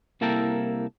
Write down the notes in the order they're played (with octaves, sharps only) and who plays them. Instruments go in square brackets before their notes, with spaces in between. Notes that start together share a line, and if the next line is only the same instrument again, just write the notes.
[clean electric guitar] C2 A#3 E4 A4 A#4 G5